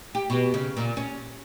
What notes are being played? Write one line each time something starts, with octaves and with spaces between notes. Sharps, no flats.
G4
B2
C#3
A#2
C#4